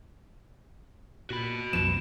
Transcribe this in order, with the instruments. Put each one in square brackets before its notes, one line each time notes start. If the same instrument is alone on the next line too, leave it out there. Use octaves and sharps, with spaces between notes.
[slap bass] A#2 [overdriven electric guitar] F#4 B5
[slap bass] C2 F#2 F3 [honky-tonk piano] E7